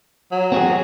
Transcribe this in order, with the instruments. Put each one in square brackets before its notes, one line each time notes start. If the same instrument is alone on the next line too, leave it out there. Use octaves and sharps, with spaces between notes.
[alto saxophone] F#3
[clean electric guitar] C4 F#4 G#4